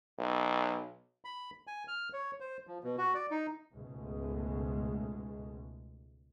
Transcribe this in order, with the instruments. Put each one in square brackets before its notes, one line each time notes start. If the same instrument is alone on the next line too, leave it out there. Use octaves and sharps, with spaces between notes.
[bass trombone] B1
[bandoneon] B5
G#5
F6
C#5
C5
F3
B2
F#4
D5
D#4
[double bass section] C#2 G#2 B2 G#3 A3